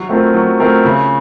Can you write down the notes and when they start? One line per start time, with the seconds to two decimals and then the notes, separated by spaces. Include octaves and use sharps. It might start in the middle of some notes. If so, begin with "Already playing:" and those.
Already playing: F#3
0.09 A3 C4 F4 A#4
0.34 F#3
0.60 A3 C4 F4 A#4
0.85 C#3